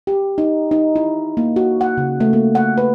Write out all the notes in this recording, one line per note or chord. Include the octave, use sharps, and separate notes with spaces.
G4
D#4
D#4
E4
A#3
F#4
F#5
C#3
A3
A#3
F#5
B4